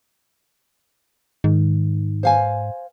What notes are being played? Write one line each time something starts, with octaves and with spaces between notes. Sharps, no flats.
G#2 D#3
C5 F5 G#5